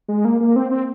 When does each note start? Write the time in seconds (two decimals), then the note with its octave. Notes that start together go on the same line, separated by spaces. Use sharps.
0.09 G#3
0.25 A#3
0.41 A#3
0.56 C4
0.71 C4